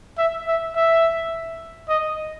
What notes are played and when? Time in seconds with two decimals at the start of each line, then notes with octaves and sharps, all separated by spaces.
0.18 E5
0.47 E5
0.75 E5
1.89 D#5